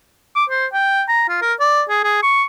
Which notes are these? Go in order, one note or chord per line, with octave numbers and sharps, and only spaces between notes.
D6
C5
G5
A#5
F4
A#4
D5
G#4
G#4
C#6